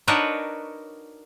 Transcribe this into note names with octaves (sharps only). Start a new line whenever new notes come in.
D4 D#4 F#4 A#4 B4 C#5